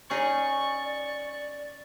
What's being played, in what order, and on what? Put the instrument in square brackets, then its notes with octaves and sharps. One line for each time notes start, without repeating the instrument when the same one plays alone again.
[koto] C#4 D#4 G#4 [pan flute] D5 [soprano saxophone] C#6